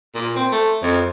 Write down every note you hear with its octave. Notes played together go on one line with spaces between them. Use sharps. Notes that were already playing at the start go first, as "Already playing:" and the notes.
A#2
C4
A3
F2